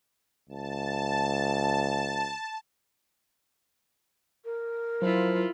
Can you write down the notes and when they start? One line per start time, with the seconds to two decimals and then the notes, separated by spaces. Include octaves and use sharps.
0.49 C#2 A5
4.45 A#4
5.02 F3 F#3 E4 F4